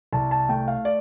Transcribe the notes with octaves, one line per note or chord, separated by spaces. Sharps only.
C2 A5
A5
A3 G5
F5
D5